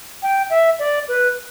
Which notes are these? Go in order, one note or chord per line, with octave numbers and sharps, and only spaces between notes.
G5
E5
D5
B4